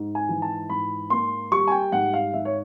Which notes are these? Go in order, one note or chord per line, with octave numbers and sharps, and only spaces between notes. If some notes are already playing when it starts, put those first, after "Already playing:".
Already playing: G#2
G#5
E3
A5
G#2 B5
A#3 C6
G3 C#6
G#5
G5
G#2 F#5
F5
G#2 E5
C#5